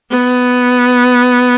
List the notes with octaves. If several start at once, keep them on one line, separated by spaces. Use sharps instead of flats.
B3